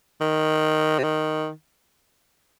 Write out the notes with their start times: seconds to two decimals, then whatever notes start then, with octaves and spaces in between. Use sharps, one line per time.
0.21 D#3
0.99 C3
1.03 D#3